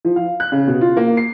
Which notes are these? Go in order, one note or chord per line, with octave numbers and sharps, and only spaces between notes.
F3
F5
F#6
C#3
B2
F4
A#3
C7